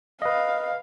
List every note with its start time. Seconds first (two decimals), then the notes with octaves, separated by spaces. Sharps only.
0.22 B4 D#5 F5